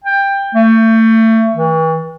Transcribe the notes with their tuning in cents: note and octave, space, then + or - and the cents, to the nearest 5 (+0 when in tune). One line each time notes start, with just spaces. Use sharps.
G5 +15
A3 +30
E3 -40